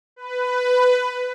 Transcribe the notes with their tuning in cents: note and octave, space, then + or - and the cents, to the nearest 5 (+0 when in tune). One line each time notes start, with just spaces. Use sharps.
B4 +15